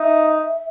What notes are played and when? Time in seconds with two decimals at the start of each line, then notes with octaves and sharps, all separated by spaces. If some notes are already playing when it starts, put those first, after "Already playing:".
Already playing: D#4 E5